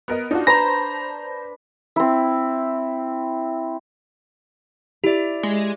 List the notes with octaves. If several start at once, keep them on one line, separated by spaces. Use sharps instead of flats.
B3 A#4 D#5
D4 D#4 F4 F#4
B4 C5 A5 A#5 C6 A#6
C4 E4
E4 G4 D5
G#3